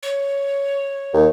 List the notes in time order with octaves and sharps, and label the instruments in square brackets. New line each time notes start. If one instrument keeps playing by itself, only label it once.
[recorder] C#5
[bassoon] D#2